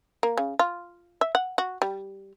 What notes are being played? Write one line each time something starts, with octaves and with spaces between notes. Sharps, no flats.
A#3
C#3
F4
E5
F#5
F#4
G3